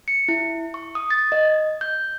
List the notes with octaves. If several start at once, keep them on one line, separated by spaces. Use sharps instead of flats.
C#7
E4
C#6
D#6
A6
D#5
G6